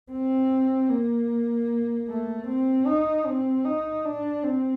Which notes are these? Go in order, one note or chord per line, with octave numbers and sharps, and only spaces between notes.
C4
A#3
A3
C4
D#4
C4
D#4
D4
C4